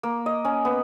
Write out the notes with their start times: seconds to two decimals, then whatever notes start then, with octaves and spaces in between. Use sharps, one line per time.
0.03 A#3
0.26 D#5
0.45 C#4
0.65 B3